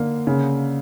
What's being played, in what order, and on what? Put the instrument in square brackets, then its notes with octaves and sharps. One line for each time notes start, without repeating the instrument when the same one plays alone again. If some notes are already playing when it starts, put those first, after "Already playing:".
Already playing: [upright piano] D3 A#3
C#3